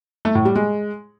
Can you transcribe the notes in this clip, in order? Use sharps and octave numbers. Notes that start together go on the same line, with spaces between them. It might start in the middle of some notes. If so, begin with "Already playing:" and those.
A3
A2
G3
G#3